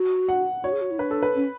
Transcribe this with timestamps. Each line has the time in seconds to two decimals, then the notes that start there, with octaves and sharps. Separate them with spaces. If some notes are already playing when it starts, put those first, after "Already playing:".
Already playing: F#4
0.29 F#5
0.63 F#4 C#5
0.72 G#4
0.81 F#4
0.91 E4
0.99 D4 B4
1.11 A4
1.23 B4
1.35 C#4